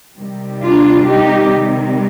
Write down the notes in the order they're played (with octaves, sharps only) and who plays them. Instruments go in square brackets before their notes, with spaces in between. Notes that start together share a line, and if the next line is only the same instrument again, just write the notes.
[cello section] C3 D#3 G3
D4 F4
D#4 G4